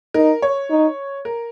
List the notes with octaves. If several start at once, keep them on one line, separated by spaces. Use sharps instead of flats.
D#4 A#4
C#5
D#4
A#4